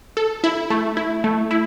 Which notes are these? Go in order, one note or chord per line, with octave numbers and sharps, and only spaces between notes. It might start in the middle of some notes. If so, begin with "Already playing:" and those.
A4
E4
A3
E4
A3
E4